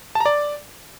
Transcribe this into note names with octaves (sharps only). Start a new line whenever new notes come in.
A5
A#5
D5